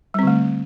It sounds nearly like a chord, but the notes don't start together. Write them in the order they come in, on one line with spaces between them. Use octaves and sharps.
G3 C4 D3 A3